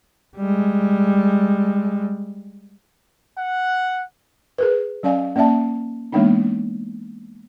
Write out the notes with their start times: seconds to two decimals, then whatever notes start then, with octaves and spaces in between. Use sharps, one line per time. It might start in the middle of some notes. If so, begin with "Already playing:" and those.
0.37 G3 G#3
3.38 F#5
4.58 G#4 A#4 B4
5.03 F#3 C#4 D5 F5 G#5
5.36 A#3 C#4 D5 E5 A5
6.12 E3 G#3 A#3 B3 D4 D#4